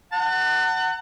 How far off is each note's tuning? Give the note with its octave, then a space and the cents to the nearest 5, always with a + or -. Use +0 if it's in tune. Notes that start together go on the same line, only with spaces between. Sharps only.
F#5 +15 A5 +45